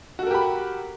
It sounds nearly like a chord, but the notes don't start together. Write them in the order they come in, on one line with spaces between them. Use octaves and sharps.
F#4 A4 A#4 G4 B5